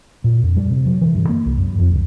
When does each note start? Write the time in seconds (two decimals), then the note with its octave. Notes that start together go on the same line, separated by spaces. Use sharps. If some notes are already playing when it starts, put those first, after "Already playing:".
0.24 A#2
0.43 F2
0.57 G3
0.70 C3
0.86 F#3
1.01 E3
1.15 G2
1.29 A#3
1.46 C2
1.58 F#2
1.79 F2
1.92 C#2